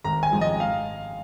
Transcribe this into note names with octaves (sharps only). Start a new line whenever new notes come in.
G#1 A#5
G#5
G#2 F3 G#3
D#5
F5